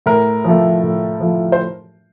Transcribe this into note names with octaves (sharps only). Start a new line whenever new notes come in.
A2 A#4
F3 A3
A2
F3 A3
C5